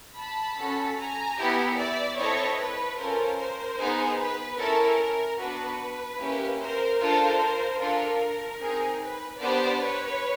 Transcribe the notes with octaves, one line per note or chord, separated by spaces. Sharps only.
A5 B5
C#4 F#4 A4
G#5 A#5
B3 E4 G4
D5 E5
C4 E4 A4 C#5 D#5
B4
C#4 F4 A4 A#4 C5
A#4 C5
B3 D#4 G#4
B4
C#4 E4 A4 A#4
B3 D4 F#4 B4
A#3 C#4 E4 G4
A#4 C5
D4 F4 A4 A#4 C5
D4 F4 A4 A#4
C4 D#4 G#4
B4
B3 D4 G4 C5 D5
B4 C#5